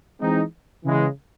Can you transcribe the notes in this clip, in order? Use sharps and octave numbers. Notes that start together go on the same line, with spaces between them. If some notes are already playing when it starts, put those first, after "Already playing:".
E3 G#3 C4 D#4
C#3 E3 G#3